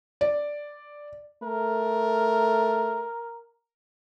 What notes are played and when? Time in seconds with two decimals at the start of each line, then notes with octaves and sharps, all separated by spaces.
0.21 D5
1.43 A3 A#4